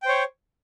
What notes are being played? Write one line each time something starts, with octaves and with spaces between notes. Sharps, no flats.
C5 C#5 G5